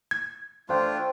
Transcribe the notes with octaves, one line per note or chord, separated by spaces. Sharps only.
G#6
A3 D4 F4 C5 G5